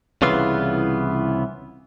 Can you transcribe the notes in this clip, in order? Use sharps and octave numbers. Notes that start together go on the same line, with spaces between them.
C2 C#3 E3 B3 F4